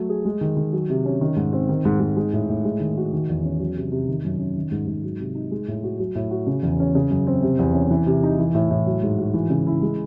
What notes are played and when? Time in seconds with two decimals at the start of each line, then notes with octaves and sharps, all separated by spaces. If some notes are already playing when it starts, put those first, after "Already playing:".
Already playing: F#3 A3
0.10 G#4
0.25 G#3
0.41 D#3
0.57 D#3
0.73 F#3
0.90 C3
1.06 C#4
1.21 D#3
1.37 G#2
1.53 C4
1.69 D#3
1.85 G#2
2.00 G#2
2.17 G#3
2.33 A2
2.49 A2
2.65 G#3
2.80 D#3
2.97 F#4
3.13 D#3
3.29 E2
3.44 C#4
3.60 F#3
3.76 C3
3.92 C3
4.09 D#3
4.25 F#2
4.39 C#4
4.56 D#3
4.72 G#2
4.87 G#2
5.04 F#3
5.20 C3
5.35 D#4
5.51 G#3
5.68 A2
5.84 F#4
5.99 F#3
6.15 A2
6.31 F#4
6.47 C#3
6.63 E2
6.80 C#4
6.95 C#3
7.10 F#2
7.27 C4
7.42 C3
7.59 E2
7.75 C#4
7.91 E3
8.06 C3
8.23 D#4
8.39 E3
8.55 A2
8.71 A2
8.87 F#3
9.03 G#2
9.18 F#4
9.34 E3
9.50 C#3
9.67 E4
9.82 G#3